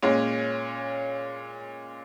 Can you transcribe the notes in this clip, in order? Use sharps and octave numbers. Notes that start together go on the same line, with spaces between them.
A#2 G#3 C#4